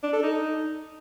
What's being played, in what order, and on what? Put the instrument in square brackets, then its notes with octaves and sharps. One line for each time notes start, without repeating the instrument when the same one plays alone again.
[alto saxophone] D4
A4
D#4